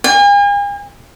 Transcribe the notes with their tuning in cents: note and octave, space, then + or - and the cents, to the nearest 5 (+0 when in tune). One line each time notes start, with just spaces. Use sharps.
G#5 -45